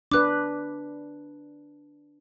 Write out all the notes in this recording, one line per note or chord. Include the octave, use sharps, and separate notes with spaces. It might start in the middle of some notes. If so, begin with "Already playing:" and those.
D4 B4 D6 F#6